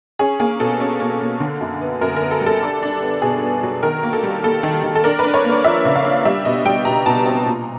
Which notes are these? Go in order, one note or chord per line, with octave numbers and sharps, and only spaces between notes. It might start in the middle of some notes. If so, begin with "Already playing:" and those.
C#4 G#4
A#3 G#4
B2 A4
C#4
A#3
A#3
D3
F#2
B3
F#2 A#4
A#4
B3
A4
G3
A4
D4
D4
B3
B2 G#4
B3
F#3
D#3 A#4
A#3
A4
G3
A#3 A4
D#3
D#3
A4
D4 A#4
D4 B4
C#5
A#3
D5
F3 E5
C#3
F5
D4
G3 E5
B2 D#5
G3 G5
B2 A#5
B2 A5
C4 A#5
A#2